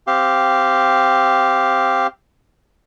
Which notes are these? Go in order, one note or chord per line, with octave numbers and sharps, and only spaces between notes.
C4 G4 F5